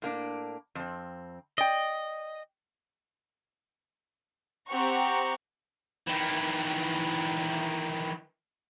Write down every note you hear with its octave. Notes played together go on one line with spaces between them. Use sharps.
A2 A#3 D4
F2 C4
D5 D#5 G5
C4 G4 F#5 A#5 C#6
D#3 E3